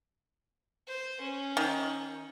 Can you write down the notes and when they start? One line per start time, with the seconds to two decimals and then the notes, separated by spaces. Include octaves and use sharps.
0.87 C5
1.21 C#4
1.57 D#3